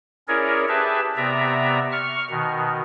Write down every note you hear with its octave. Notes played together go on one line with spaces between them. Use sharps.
C#4 E4 G#4 A#4 C#5 D5
G4 G#4 B4 E5 A5
C3 B3 D5 E5 A#5
C#6 F6
B2 D#3